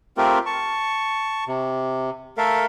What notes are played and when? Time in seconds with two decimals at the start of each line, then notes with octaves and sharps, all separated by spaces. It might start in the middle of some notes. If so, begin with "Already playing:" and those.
0.17 A3 C4 F4 G4 A#4
0.46 A5 C#6
1.48 C3
2.37 A3 A4 A#4 E5 F5